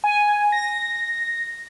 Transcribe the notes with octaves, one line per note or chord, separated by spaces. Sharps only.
G#5
A#6